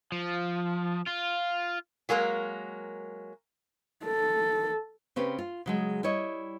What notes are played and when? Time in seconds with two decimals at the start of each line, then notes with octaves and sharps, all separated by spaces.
0.12 F3
1.07 F4
2.09 F#3 G#3 A#3 A#4
4.06 A4
5.16 C#3 C4 C#4 G4 B4
5.39 F4
5.66 C#3 F#3 G#3
6.03 G3 E4 C#5 D#5